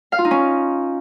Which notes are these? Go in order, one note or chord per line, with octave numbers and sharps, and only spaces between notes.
F5
F4
D#4
C#4